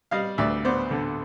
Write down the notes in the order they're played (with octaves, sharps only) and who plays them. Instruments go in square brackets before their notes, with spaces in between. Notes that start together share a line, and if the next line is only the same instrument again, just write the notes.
[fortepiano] G3 D#5 F5
D2 D5 E5
B3 C5 D5
D3